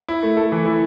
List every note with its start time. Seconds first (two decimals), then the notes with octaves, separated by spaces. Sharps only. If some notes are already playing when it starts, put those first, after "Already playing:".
0.09 E4
0.23 A3
0.37 A4
0.52 E3
0.66 E4